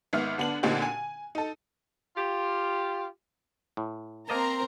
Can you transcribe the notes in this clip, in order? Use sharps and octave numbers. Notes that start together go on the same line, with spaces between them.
G#1 G#2 B3 E5 F6
D3 B3 D4 F#7
A#2 D3 A#3 C4 D#4 G4
G#5
D#4 A4
F4 G4
A2
A#3 C4 A#4 C5 D#5 A5 A#5